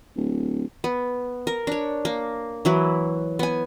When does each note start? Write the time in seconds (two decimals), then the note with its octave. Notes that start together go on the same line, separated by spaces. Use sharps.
0.16 D1
0.84 B3
1.47 A#4
1.67 D4 C#5
2.05 A#3
2.65 E3 F#3 E4
3.39 B3 G#5